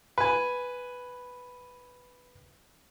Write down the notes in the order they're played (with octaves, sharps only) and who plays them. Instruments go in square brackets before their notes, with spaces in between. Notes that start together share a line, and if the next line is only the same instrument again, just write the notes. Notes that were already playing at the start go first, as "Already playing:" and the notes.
[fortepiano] B4 G#5